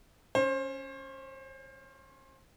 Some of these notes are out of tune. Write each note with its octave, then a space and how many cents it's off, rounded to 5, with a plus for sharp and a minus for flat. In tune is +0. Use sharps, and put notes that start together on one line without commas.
C#4 +0 C5 +30